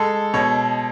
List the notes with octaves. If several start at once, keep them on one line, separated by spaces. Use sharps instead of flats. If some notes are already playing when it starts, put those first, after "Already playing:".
Already playing: G#3 A4
B2 C#5